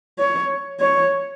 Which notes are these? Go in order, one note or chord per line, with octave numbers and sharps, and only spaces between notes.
C#5
C#5